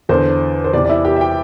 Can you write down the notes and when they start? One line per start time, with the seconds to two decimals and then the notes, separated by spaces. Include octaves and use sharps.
0.09 E2 D3 C5
0.64 C5
0.73 E2 C3 E3 D5
0.85 D5
0.89 E4 E5
1.05 G4 G5
1.16 E5
1.21 G4 G5